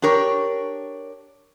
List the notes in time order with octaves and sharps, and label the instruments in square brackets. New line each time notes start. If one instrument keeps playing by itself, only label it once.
[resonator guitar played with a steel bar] D4 G4 A#4 C#5